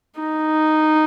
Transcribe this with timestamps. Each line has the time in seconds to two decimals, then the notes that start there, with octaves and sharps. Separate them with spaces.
0.19 D#4